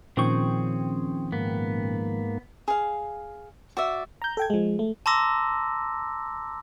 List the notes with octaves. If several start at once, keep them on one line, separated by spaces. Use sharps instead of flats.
A#2 D#3 F3 C4 C#4 G#4 G5 C#6
G#2 A#3 B3
G#4 F5
F#4 D5 E5
A#5 G6
A4 G5 G#6
F3 G#3
A3
A5 A#5 C6 D6 E6 A#6